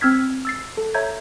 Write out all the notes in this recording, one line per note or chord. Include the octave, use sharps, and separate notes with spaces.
C4 E6 F6 G#6 B6
E6 A6 C7
A4
C#5 E5 A#5 G6 G#6